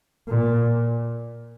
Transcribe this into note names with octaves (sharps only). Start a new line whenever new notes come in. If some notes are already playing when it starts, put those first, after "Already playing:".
A#2